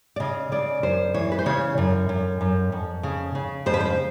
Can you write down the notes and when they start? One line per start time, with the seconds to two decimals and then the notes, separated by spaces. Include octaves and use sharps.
0.16 D5
0.20 C#3 D#5
0.52 C#3 D5
0.83 F#2 C5
1.14 E3 C#5
1.32 B4
1.39 C5
1.46 C#3 C#5
1.78 F#2
2.09 F#2
2.41 F#2
2.72 F2
3.03 C#3
3.35 C#3
3.66 F2 C5
3.74 B4
3.80 C5